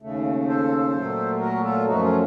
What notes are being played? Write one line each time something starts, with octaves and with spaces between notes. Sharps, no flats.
D#2 C#3 A3
A4 C5
A#2 F#3 A3
F#4 A#4
F4 A4
F#2 F3 A3 D#4 F#4
C#4 F4